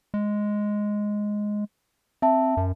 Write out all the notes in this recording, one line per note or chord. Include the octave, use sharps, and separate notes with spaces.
G#3
C4 E5 A5
F#2